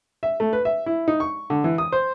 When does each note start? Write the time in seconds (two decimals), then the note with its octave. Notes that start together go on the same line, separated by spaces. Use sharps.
0.23 E5
0.40 A3
0.53 B4
0.65 E5
0.86 E4
1.08 D#4
1.20 C#6
1.50 D3
1.64 E3
1.78 D#6
1.92 C5